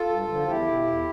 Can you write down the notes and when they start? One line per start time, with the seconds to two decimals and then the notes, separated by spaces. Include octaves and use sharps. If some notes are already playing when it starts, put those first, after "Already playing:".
Already playing: F4 A4
0.09 G2
0.28 D3 F3
0.47 E2 E4 G4
0.67 B2
0.87 E2